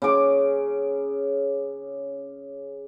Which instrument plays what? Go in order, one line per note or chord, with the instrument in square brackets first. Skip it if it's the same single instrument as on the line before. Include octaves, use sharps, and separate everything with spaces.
[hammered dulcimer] C#3 D6